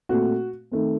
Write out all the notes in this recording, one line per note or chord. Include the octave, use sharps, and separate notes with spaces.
A#2 A3 C4 F#4
D#3 A3 C4